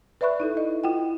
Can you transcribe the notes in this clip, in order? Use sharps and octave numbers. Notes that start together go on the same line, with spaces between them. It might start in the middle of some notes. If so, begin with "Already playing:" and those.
B4 D5 E5 B5 C#6 F#6
D#4 E4 A4
D#5
E4 F4 F#5 G5